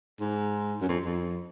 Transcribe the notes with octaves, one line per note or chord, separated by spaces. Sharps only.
G#2
F#2
F2
F2